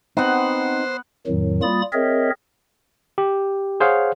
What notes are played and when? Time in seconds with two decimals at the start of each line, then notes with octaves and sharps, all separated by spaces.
0.17 B3 C4 D#4 C5 F#5
1.27 F2 A2 D#3 F#3
1.62 G3 A#3 F4 B5 D#6 A6
1.93 C4 G#4 A#4 C#5 D#5 E5
3.18 G4
3.80 G#4 C5 C#5 F5 F#5